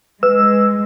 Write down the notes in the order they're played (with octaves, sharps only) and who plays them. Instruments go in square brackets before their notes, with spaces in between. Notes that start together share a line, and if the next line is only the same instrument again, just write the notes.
[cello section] G#3 [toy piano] B4 [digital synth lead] E6